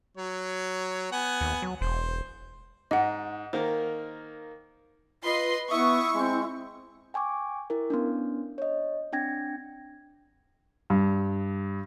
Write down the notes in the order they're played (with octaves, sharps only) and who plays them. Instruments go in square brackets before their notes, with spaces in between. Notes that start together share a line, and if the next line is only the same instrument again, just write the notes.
[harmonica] F#3 C#5
B3 F#5 G#5
[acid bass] D#2
F#3
[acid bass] E1 [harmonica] C5
[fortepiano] G#2 [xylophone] D#5 F#5
[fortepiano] D#3 A#3 A#4 [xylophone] C5
[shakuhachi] F4 [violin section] B4 D#5 C6
[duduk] B3 [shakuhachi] E4 [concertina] E5 D#6 [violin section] C#6
[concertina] G#3 [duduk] C4
[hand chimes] G5 G#5 C#6 D6
E4 A#4
B3 C#4 D4
C#5 D#5
C4 D4 G5 G#6 A#6
[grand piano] G2